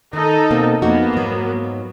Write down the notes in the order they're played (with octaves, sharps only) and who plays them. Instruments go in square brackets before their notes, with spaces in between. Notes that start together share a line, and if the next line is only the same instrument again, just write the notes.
[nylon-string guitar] D#3 [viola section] D#4 A4
[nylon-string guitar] B2 A#3 C4
[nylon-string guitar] F2 D#4 F#4 [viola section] A#3 B3
[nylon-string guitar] G#2 F#3